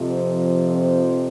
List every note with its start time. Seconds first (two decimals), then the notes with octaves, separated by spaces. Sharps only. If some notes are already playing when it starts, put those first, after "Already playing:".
Already playing: F2 C3 F3
0.70 C4